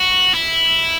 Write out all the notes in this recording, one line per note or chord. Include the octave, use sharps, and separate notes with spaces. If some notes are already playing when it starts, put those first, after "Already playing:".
Already playing: F#4
E4